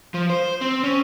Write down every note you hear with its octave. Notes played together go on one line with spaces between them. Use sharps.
F3
C5
C4
C#4